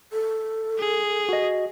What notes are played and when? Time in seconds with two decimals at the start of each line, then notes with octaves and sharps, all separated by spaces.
0.12 A4
0.79 G#4
1.29 F#4 D#5